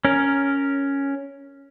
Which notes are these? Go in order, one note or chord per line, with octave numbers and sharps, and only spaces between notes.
C#4 A#4